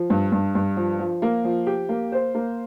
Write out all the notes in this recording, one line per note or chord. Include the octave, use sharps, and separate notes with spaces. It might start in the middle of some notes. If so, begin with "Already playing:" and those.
Already playing: F3
G2
G2
G2
F3
F3
A#3
F3
G4
A#3
C5
A#3